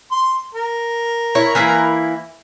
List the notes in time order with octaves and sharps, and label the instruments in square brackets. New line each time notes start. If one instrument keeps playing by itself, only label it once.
[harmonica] C6
A#4
[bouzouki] E4 C#5
E3 A#3 E4